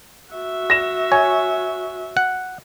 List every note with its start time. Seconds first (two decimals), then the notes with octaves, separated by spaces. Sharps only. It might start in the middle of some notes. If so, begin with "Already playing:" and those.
0.32 F#4 E5
0.70 A#6 E7
1.12 C#5 G#5
2.17 F#5